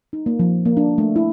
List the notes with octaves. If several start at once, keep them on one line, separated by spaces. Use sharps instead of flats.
D#4
A#3
F3
A#3
D4
A3
E4